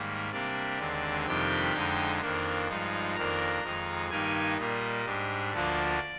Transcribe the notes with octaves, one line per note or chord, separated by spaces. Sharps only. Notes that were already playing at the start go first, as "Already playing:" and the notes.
Already playing: G#2 D#3 G3 A#3
C3 G3 A#3 D4 D5
D#2 D3 G#3 C4
F2 C3 D#3 G3 D4 G5
F2 D3 G#3 D#4
F2 D#3 A#3 D4
G2 F3 G#3 D#4
F2 D#3 A#3 D4 A#5
F2 D#3 G#3 D#4
G2 D#3 G3 A#3 D#4 G#5
A#2 G3 A#3 D#5
G#2 G3 D4
D2 D3 F3 A#3 D4 D5